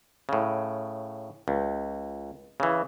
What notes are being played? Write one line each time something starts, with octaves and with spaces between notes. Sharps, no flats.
A2 C#3
C#2
C#3 E3